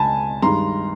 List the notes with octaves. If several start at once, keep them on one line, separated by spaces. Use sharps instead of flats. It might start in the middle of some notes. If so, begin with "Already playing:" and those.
Already playing: C#2 G#3 G#5 A5 B5
G2 D#3 G#3 A#5 C6